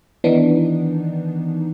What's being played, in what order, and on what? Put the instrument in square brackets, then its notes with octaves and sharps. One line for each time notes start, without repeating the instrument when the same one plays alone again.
[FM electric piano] D#3 E3 B3 D4 D#4